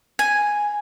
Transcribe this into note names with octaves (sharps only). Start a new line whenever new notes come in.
G#5